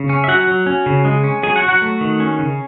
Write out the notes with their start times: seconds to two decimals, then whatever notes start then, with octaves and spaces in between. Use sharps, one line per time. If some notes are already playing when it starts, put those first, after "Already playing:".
Already playing: C#3
0.09 C#4
0.24 E5
0.28 F#3 F#4 F#5
0.47 F#3
0.66 C#4
0.86 C#3
1.05 G#3
1.24 C#4
1.43 F#3 G#4 G#5
1.56 F#4 F#5
1.63 F#3
1.68 F#4 F#5
1.82 A3
2.01 D#3
2.20 C#4
2.39 C#3